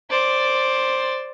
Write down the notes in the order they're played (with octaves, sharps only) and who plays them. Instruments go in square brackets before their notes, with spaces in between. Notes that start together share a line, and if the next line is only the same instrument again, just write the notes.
[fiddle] C5 D5